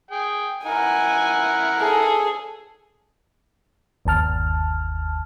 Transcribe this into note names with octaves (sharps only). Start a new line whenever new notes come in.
G#4 G5
E4 A#4 F#5 G#5
G#4 A4
G1 D#2 A5 F6